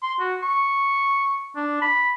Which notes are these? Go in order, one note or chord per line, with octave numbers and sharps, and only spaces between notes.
C6
F#4
C#6
D4
B5